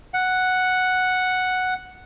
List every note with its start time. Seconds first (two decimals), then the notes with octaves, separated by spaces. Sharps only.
0.14 F#5